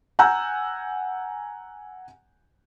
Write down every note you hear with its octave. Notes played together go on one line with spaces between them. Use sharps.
F#5 G#5 A#5 E6 F#6 G6